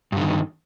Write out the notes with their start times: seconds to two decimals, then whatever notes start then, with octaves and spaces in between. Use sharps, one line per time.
0.12 G2
0.17 D3
0.21 D#3